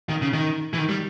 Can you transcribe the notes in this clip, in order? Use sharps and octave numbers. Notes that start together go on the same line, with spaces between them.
D#3
C#3
D#3
E3
D#3
G3